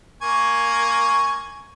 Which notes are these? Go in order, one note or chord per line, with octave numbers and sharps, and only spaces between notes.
A#3 G#5 C#6